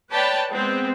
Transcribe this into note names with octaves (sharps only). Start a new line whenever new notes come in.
B4 C#5 D5 G5 A5 B5
G#3 B3 C4